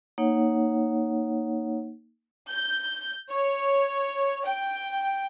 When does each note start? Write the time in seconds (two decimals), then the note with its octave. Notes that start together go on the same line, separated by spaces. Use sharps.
0.18 A#3 D#4 C#5 F#5
2.48 G6
3.30 C#5
4.45 G5